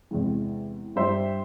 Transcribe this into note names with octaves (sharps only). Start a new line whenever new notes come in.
E2 C3 E3 G#3
G2 G3 C5 E5